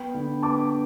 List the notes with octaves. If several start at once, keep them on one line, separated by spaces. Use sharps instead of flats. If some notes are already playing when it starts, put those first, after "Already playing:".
Already playing: B3 G5 B5
D3
B3 A5 D6